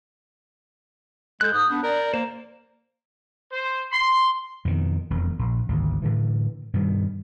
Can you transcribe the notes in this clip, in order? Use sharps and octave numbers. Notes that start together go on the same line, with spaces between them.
G#3 A4 F#6 G6
G#2 D#6
B3 D4
A#4 D5
A#3 C5
C5
C6
F2 B2 D#3
E1 F2
A#1
G#1 D2
A2 D3 E3
G2 B2 D#3